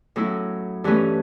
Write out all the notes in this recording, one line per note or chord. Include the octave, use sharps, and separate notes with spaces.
A2 F#3 C#4 E4
G2 E3 A3 C#4